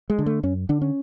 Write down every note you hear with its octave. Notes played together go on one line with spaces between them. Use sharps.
G#3
D3
A3
F#2 C#4
D3 D4
C#4